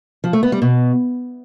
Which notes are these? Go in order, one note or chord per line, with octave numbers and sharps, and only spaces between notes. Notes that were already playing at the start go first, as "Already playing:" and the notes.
F3
A3
B3
G3
B2